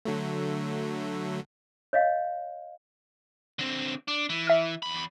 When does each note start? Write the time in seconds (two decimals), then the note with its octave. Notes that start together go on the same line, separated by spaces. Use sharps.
0.05 D3 F#3 A3
1.93 C#5 D#5 F5
3.59 D3 C4
4.08 D4
4.30 E3
4.47 E5 F6
4.82 E2 B5